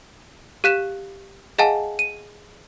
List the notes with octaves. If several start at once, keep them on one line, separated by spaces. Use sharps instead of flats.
G4 F5 F#6 B6 E7
G#4 D#5 F5 F#5 G#5 A5
D#7